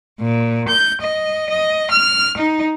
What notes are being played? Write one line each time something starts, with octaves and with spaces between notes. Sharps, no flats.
A#2
G6
D#5
D#5
F6
D#4